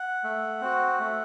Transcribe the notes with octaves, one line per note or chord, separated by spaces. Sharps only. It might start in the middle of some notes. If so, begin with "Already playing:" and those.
Already playing: F#5
A3
C4 F#4
A3